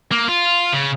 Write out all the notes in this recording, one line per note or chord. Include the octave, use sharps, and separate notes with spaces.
A#3
F4
C#3